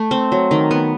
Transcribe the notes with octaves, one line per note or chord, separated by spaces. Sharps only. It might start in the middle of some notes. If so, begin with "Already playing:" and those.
Already playing: A3
C4
F#3
D#3
B3